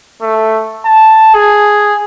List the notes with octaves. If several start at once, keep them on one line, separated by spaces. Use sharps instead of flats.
A3
A5
G#4